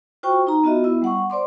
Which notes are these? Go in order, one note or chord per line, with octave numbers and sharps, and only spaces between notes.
F4 F#4 C5 G5 C#6
D#4 A#5
B3 F4 F#4 D#5 E5
B3 E4 E6
G3 F#5 C#6
C5 D5 C6 D6